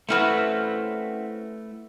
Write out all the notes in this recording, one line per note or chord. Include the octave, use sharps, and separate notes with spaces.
A3 C4 C#4 E4 F#4 B4